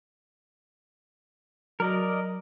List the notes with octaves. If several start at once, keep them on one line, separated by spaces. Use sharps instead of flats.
F#3 A#4 D5 D#5